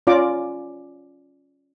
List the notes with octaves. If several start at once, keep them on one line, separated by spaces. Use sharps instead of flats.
C#4 F4 D5 F5 A#5 D6